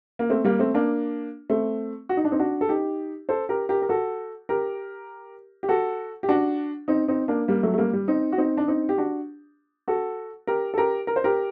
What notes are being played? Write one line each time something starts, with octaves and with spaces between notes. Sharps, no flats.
A#3
A3 C4
G3 A#3
A3 C4
A#3 D4
A3 C4
F#4
D#4
D4
C4 D#4
D4 F#4
A4
D#4 G4
A4 C5
G4 A#4
G4 A#4
A#4
F#4 A4
G4 A#4
G4
F#4 A4
G4
D4 F#4
C4 D#4
C4 D#4
A#3 D4
G3 A#3
F#3 A3
A3
G3 A#3
G3
C4 D#4
F#4
C4 D#4
D4
C4 D#4
G4
D4 F#4
F#4 A4
G4 A#4
A4
G4 A#4
A#4
C5
G4 A#4